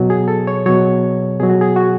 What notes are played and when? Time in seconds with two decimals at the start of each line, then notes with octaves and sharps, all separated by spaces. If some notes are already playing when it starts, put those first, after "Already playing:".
Already playing: B2 F#3
0.10 G#4
0.28 A4
0.47 C#5
0.66 B2 F#3 C#5
1.40 B2 F#3 G#4
1.49 F#4
1.61 G#4
1.76 F#4